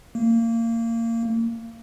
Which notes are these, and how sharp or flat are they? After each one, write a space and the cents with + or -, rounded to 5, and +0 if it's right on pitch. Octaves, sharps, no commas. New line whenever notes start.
A#3 -25